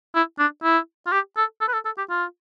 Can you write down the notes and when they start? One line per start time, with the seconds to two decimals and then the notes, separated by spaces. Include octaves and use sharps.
0.15 E4
0.39 D4
0.64 E4
1.07 F4
1.12 G4
1.37 A4
1.61 A4
1.68 B4
1.73 A4
1.85 A4
1.98 G4
2.10 F4